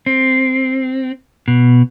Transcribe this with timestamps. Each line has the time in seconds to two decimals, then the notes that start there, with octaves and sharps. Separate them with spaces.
0.06 C4
1.48 B2